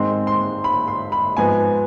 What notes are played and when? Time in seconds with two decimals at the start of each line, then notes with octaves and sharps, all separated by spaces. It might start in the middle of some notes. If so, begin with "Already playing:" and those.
Already playing: G#2 D#3 G#3 C4 C6
0.27 C6
0.64 B5
0.88 C6
1.12 B5
1.37 G#2 F3 B3 G#5